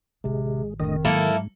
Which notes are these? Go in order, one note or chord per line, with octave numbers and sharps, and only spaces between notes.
A1 C3 D#3 G#3
F1 A2 D3 D#3 C4 D#5
G#2 F#3 A#3 E4 A4